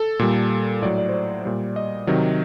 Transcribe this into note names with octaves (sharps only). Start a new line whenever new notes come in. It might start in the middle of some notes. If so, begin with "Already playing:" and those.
Already playing: A4
A#2 G3
A2 F#3 D5
D5
C5
D5
A#2 G3
D#5
C3 D#3 F#3